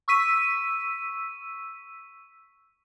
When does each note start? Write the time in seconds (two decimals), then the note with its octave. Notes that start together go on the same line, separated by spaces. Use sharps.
0.08 C#6 E6 B6 D#7